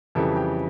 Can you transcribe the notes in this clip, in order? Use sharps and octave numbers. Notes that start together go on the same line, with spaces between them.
F2 C#3 E3 G3 A4
G4